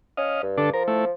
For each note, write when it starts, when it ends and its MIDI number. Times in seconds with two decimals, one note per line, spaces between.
0.17 0.43 61
0.17 0.42 75
0.17 0.42 77
0.43 0.70 43
0.58 0.70 50
0.58 0.70 62
0.58 0.70 69
0.73 1.11 53
0.73 0.83 70
0.88 1.05 57
0.88 1.05 64